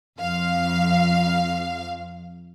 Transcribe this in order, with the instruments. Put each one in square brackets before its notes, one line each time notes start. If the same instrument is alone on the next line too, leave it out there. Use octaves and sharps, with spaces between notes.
[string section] F2 F5